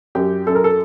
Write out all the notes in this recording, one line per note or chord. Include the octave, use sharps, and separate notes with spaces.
F#2 G4
F#2 A4
A#4
A4